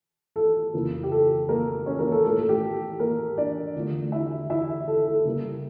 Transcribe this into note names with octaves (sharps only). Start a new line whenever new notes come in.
A4
F2 C#3 E3 A#3
G4
A4
A#3 A#4
C#4 C#5
A#3 A#4
A4
A2 F3 A3 A4
A4
G4
A#3 A#4
D4 D5
E2 D3 F3 A3
E4 E5
E4 E5
A4
A4
C#3 G3 A#3